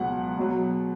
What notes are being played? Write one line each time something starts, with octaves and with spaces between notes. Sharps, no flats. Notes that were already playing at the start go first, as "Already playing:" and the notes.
Already playing: C#2 B2 F#3 F#5
B2 F#3